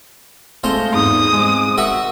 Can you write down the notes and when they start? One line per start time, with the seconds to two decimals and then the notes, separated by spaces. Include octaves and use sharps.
0.64 G#3 A3 F4 C5 D#5
0.94 E2 G#2 D#6
1.33 G#3 C4
1.77 F#4 A#4 E5 F#5